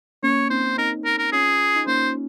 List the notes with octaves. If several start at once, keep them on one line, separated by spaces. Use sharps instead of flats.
A#3 C#4 C#5
C4 D#4 C5
C4 D#4 A#4
A#4
A#4
C#4 F4 G#4
D#4
A#3 C#4 C5